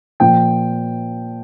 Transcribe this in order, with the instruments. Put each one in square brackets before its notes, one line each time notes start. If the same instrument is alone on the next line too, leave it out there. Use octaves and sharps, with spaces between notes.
[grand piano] A#2 F3 G5